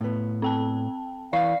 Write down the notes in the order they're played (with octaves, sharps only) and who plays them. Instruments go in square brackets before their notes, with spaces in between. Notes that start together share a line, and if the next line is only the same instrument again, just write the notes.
[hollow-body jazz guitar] A2 B3
[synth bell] C4 G5 A5
[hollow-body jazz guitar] E3 [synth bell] D5 C#6 C7 [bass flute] F5